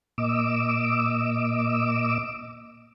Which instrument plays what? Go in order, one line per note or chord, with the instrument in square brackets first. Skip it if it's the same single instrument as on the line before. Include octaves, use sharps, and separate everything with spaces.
[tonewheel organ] A#2 D#5 D6 E6